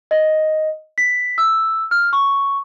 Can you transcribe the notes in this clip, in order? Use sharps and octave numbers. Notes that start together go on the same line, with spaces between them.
D#5
B6
E6
F6
C#6